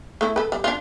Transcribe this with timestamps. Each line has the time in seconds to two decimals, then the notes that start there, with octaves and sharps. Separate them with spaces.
0.21 A3 E4
0.36 A4 B4
0.52 G3
0.64 D4 F4